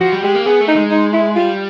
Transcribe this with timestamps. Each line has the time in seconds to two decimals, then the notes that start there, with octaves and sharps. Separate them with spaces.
0.01 F3 F#4
0.12 G3
0.23 G#3 G4
0.35 A#3
0.46 B3 G#4
0.61 A3
0.68 D#4
0.76 G#3
0.91 D#4
1.13 E4
1.35 G3 F4